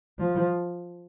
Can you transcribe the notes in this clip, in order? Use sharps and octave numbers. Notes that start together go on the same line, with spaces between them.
F3